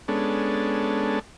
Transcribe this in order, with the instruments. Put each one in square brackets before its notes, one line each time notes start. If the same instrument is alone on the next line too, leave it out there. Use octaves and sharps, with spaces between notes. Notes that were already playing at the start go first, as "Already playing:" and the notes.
[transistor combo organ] G#3 B3 C#4 D4 A4